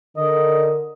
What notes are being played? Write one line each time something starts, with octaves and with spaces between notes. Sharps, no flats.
D3 A#4 D#5